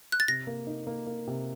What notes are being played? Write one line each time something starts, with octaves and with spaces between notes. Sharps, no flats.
F#6
A6
C3 A#6
A#3
D#4
A#3
A#3
C3